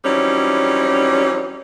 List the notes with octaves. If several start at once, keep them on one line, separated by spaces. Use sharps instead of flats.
E3 F#3 G3 C4 C#4 D#4